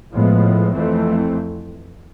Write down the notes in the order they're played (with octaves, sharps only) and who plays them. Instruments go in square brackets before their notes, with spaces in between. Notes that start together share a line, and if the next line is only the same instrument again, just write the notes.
[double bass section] A2 F3 G#3 B3
F2 E3 A3 C4